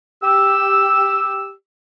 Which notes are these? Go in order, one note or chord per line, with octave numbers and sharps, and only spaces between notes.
G4 E6